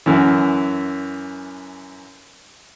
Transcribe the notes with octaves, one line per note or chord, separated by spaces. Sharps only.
F#2 E3